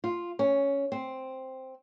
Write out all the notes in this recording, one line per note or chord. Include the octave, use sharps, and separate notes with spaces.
F4
C#4
C4